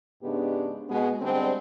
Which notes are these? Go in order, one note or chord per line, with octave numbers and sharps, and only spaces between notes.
G#2 C#3 G#3 B3 D4 G4
B2 G#3 B3
D3 G3 G#3 C4